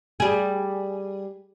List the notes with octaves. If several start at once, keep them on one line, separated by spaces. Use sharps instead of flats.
G3 G#4